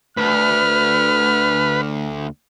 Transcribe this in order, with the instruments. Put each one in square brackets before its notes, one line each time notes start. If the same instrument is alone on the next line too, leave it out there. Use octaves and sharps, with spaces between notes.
[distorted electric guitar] D2 [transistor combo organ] B4 [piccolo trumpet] F6